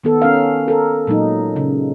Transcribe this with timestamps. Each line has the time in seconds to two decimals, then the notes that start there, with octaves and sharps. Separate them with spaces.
0.04 D#3 B3 A4
0.22 C#4 A#4 F5
0.68 A4 A#4
1.07 A#2 F#3 G#3 D#4
1.56 C#3